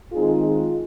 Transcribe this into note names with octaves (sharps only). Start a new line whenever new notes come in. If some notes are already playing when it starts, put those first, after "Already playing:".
D#3 G#3 C4 D#4 F4 G#4
F4